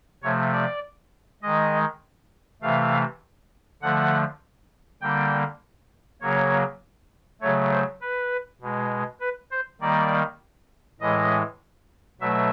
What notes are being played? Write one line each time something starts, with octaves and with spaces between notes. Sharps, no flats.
C3 F3 A3 C#5
D5
D#3 G#3 D#5
C3 E3 A3 F5
D3 F3 A3 F#5
D3 G3 A#3 G5
C#3 F#3 A#3 C#5
C#3 F#3 A3 C#5
C5
B4
B2 G#3
B4
C5
D#3 G3 A#3 D5
A2 E3 G#3 D#5
B2 F#3 A3 E5